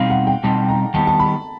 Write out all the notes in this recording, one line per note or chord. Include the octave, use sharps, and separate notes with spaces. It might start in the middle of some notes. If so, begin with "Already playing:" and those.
Already playing: B2 G3 C4 D#4 F5
F#5
G5
B2 G3 C4 D#4 A5
A#5
D#3 G3 B3 A5
A5
B5